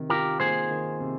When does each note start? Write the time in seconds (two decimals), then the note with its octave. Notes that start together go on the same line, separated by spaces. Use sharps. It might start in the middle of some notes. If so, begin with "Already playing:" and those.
Already playing: C3 D#3
0.10 F4 G4 A#4
0.40 A#3 G#4 C5
0.70 D#3
1.00 C3